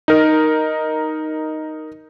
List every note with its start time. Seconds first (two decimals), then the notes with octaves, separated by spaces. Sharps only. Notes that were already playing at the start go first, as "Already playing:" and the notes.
0.08 D#4 A#4